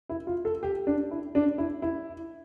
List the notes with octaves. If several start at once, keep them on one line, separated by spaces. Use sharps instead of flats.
E4
F4
A4
G4
D4
E4
D4
E4
E4